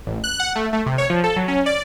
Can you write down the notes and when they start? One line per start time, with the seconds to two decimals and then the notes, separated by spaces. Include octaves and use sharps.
0.07 A1
0.24 F#6
0.40 F#5
0.55 A3
0.73 A3
0.86 C3
0.98 C#5
1.10 F3
1.24 A4
1.36 F#3
1.48 C#4
1.66 D5